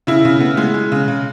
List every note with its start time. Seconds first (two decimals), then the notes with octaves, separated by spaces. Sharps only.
0.07 C#3 E4
0.25 C#3
0.40 B3
0.57 G#3
0.74 G#3
0.92 C#3
1.08 C#3